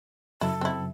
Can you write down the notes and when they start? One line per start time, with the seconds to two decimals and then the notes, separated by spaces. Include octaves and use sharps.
0.41 F#2 C#3 F#3 E4 A4
0.61 C4 E4